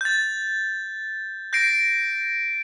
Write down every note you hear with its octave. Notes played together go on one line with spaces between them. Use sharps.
G6 A6
G6 A#6 C7 D7